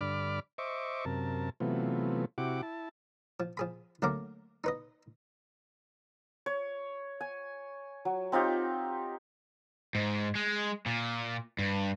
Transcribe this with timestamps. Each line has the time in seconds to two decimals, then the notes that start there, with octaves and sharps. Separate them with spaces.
0.01 G2 D3 D5 B5 D6 F6
0.58 C5 D#5 E5 C#6 D6
1.05 F#2 C3 A#4 A5
1.60 C3 E3 F#3 A3 B3 F4
2.38 C3 E4 F#4 G4 F#5 D6
2.62 E4 A5
3.40 F3
3.57 F3 G#4 B5
4.02 D2 F#3 A3 A#3 A#4 D6
4.64 D#4 B4 D#5
6.46 C#5
7.21 G#5
8.05 F#3
8.32 C4 D#4 F4 G4
9.95 G#2
10.35 G#3
10.86 A#2
11.59 G2